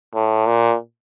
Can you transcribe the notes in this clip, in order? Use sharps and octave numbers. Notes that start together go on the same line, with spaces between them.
A2
A#2